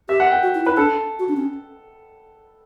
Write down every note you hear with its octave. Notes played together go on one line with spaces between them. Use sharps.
G4 E5
F#5
G5
F#4
E4
E4 B4
D4 A4
F#4
D4
C#4